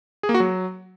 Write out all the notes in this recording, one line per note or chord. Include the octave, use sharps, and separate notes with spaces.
G#4
A#3
F#4
F#3